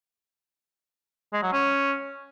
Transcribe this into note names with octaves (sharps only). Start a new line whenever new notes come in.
G#3
F#3
C#4